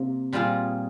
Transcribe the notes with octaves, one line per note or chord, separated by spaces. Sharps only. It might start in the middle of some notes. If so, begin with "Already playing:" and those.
Already playing: C3 A#3
A#2 G3 C4 F4 G#4